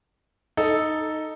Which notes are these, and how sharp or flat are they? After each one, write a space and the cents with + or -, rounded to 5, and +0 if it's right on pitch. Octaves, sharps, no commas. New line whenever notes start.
D#4 +0 A4 +0